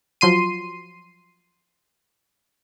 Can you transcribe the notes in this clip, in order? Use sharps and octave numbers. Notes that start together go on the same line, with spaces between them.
F3 F#3 C6 C7 D#7